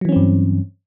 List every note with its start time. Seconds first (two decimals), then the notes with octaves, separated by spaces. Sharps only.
0.01 F#3
0.05 E3
0.09 C#4
0.12 C4
0.16 G2